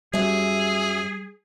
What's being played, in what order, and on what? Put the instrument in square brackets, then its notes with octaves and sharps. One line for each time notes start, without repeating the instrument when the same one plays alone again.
[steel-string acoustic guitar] F#2 E5 [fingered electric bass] G3 [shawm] G#4